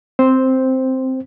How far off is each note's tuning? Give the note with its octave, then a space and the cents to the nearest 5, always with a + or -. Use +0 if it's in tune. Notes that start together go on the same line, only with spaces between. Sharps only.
C4 +0 C5 +0